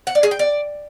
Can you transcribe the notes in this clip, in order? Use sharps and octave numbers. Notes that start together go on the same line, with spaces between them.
F#5
D5
G#4
G5
D5